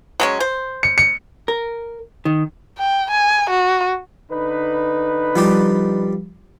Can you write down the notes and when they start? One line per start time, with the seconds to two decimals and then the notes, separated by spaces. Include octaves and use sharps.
0.20 F#3 G#3 C#4
0.40 C5
0.83 C#7
0.98 C#7
1.48 A#4
2.25 D#3
2.78 G5
3.11 G#5
3.50 F#4
4.30 D3 D#4 B4
5.36 F3 G3 G4